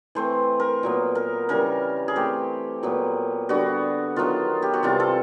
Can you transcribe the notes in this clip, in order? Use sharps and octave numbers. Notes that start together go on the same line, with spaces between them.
E3 A3 C4 C5
A#4
A#2 F#3 B3
A#4
C#3 E3 G3 A#4
G#4
E3 A3 C4 G4
A#2 F#3 B3
D3 G3 B3 F#4
D#3 F#3 B3 F4
G4
F#4
C3 E3 G3 C4 F4
A4